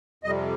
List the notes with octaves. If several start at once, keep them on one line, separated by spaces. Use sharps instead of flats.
F2 C3 G3 D#5